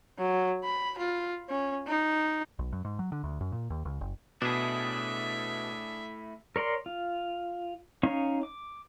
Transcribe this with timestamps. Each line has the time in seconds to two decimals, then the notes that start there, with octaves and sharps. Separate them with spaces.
0.19 F#3
0.64 B5
0.98 F4
1.50 C#4
1.87 D#4
2.59 B1
2.73 F#2
2.85 G#2
2.99 F#3
3.12 D3
3.24 D2
3.41 F#2
3.52 A#2
3.70 D#2
3.85 C#2
4.01 F#1
4.42 B2 A3 D4 E4 G#4 E5
6.56 A#4 C#5 D5 C6
6.86 F4
8.03 C#4 D#4 C#5 F5 C#6
8.43 D6